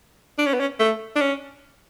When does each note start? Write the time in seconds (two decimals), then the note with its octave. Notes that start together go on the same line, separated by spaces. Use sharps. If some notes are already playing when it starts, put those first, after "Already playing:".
0.38 D4
0.46 C#4
0.54 B3
0.60 C#4
0.79 A3
1.16 D4
1.21 C#4